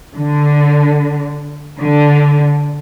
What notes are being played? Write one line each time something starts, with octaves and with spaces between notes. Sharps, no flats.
D3
D3